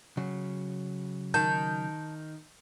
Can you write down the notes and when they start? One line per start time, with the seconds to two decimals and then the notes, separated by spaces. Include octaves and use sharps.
0.17 C#3 F#3
1.34 D#3 A5 G6